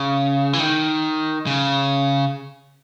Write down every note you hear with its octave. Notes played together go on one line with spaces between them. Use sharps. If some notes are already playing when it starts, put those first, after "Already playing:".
Already playing: C#3
E3
D#3
C#3